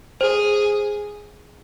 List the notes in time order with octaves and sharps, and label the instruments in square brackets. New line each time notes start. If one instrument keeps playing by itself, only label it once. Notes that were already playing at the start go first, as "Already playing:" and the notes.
[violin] G#4 [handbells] C5